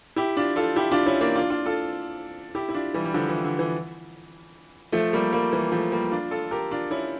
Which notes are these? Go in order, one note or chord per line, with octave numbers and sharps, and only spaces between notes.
E4 G4
D4 F4
F4 A4
E4 G4
D4 F4
C#4 E4
A#3 D4
D4 F4
D4 F4
F4 A4
E4 G4
E4
D4 F4
E3 G3
G3
D3 F3
E3
D3
E3
F3 A3
G3 A#3
G3 A#3
E3 G3
F3 A3
G3 A#3
D4 F4
F4 A4
G4 A#4
D4 F4
C#4 E4